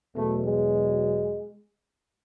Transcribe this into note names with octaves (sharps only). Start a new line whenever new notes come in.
E2 B2 F#3 A3
G#3